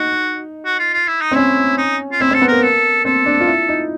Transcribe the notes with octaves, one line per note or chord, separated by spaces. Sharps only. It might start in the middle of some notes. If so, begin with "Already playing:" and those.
Already playing: D#4 F#4
F#4
F4
F4
E4
D#4
C4
C#4 E4
D#4
F4
C4 E4
C4
A4
B3
A#3 A#4
A4
C4 A4
D4
F4
E4
D#4